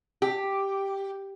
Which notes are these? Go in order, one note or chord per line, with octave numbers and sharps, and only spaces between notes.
G4